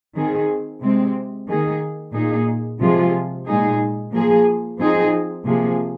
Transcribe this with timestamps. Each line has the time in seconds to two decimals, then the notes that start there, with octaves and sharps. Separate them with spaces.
0.15 D#3 C4 G#4
0.82 C3 G#3 C4
1.47 D#3 A#3 G#4
2.14 A#2 A#3 D#4 G#4
2.80 C3 F3 G#3 F4 G#4
3.46 A#2 G#3 D#4 G#4
4.12 F3 A#3 G#4
4.78 F3 C4 D#4 G#4
5.44 C3 F3 A#3 G#4